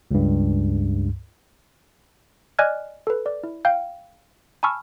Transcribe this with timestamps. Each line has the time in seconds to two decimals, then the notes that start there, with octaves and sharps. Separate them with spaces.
0.11 C#2 G2
2.59 D5 D#5 G#5 F6 F#6 G#6
3.07 A4 B4
3.26 D5
3.43 E4
3.65 F5 G5 G6
4.63 G#5 A5 B5 C#6 E6 F6